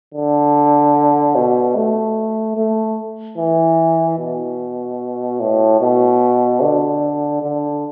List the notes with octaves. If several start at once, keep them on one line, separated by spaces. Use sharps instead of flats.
D3
B2
A3
A3
E3
B2
A2
B2
D3
D3